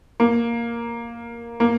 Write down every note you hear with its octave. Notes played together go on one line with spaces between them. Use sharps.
A#3
A#3